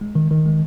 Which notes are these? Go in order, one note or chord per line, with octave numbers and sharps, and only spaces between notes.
G#3
D#3
D#3
G#3